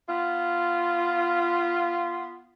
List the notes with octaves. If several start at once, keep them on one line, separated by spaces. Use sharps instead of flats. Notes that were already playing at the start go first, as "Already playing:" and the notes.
B3 F4